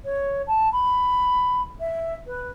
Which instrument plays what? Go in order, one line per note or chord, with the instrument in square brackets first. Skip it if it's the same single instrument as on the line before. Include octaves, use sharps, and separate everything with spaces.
[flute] C#5
A5
B5
E5
B4